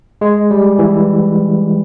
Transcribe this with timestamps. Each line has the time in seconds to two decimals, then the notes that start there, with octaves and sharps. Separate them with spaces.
0.21 G#3
0.51 G3
0.79 E3